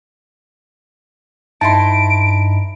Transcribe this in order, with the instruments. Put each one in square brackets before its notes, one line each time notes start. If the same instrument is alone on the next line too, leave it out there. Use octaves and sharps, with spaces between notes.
[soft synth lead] G2 [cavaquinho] D#4 E4 C6 [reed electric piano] A5 [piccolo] D7